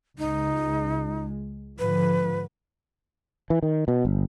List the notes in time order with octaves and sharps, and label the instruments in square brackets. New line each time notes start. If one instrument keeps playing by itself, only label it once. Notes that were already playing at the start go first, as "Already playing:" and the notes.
[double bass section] C#2 G#3 [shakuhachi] D#4
[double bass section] G#2 D3 F3 [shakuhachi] B4
[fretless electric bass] E3
D#3
B2
G1